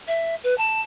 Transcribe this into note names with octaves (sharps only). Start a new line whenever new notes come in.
E5
B4
A5